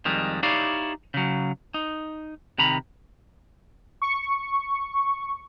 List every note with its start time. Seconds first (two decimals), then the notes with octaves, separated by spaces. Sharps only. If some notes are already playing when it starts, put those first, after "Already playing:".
0.05 F2 D#3 G3 G#3
0.43 D#4 E4 G4 C#5 D5 F5
1.14 C#3 F#3
1.74 D#4
2.58 C3 D#3 A#5 B5
4.02 C#6